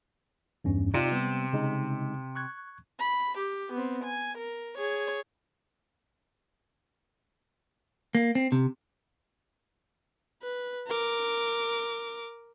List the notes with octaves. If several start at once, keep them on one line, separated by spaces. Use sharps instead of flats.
E2 G2 C#4
C3 D#4 F4 D5
G3 B3
C#3 G#3 D#4
C#6 F#6 G#6
B5
G4
B3 C4
G#5
A#4
G#4 C#5
A#3
C4
C3
B4
A#4 D6